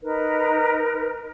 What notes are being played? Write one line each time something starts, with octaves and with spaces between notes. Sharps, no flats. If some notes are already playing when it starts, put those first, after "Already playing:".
D#4 A#4 B4